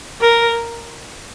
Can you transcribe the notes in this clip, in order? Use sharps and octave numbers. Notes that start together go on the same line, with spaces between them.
A#4